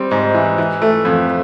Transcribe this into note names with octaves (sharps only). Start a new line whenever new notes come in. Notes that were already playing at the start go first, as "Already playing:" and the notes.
Already playing: G3 C4
G#2
E3
E3
A3
F2